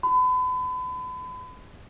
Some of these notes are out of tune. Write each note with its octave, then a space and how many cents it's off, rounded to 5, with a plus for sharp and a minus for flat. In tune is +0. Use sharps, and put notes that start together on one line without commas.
B5 +35